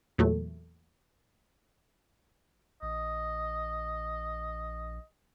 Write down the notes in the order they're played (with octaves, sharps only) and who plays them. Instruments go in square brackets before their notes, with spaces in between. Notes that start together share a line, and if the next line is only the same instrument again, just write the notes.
[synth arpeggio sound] E2 A#2 F#3 A3
[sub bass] A#1 [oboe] D#5